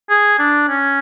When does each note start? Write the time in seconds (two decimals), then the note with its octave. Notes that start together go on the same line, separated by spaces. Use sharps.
0.10 G#4
0.39 D4
0.69 C#4